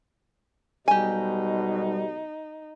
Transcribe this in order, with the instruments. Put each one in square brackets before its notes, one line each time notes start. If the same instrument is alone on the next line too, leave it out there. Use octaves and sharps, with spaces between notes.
[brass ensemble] B1 G#2 B2 [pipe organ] G3 [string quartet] D#4 [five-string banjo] G4 G#5